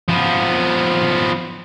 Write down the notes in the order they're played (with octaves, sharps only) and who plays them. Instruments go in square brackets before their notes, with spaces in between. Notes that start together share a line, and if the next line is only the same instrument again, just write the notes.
[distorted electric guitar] F3 B3